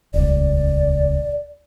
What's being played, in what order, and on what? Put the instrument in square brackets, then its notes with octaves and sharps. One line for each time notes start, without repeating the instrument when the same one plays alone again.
[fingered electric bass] D#1 C#2 [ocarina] D5